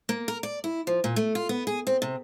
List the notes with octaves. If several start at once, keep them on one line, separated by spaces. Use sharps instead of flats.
A#3
A#4
D5
E4
F3
A#2
A3
F4
B3
G#4
C4
C3